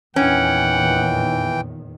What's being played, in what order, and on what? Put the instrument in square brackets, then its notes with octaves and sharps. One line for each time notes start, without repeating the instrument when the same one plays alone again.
[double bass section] E2 A#2 D#3 [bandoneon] E3 G5 [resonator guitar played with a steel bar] C#4 [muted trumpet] F#5